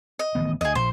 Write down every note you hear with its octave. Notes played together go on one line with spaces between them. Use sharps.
D#5
A1 D#3 B3
D2 G#4 D#5
A#1 C5